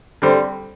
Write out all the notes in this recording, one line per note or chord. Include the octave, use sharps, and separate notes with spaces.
D3 G3 C4